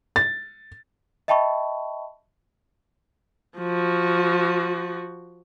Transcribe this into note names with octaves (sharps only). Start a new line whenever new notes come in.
A6
D#5 E5 G5 A5 B5 C#6
F3 F#4